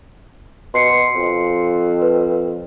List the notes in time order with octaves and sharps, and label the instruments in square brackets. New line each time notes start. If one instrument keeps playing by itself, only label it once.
[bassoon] B2 [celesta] C6 C7 C#7
[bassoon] F2
[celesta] B4